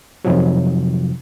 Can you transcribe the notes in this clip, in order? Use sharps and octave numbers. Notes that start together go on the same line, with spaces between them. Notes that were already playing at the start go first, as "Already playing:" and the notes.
F2 C3 D#3 F3 F#3